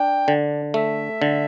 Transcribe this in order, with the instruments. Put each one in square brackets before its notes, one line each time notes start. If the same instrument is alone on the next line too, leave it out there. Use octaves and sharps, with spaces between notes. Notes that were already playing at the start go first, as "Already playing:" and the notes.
Already playing: [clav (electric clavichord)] D4 [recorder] G5
[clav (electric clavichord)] D3
[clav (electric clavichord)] A3 [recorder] E5
[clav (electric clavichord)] D3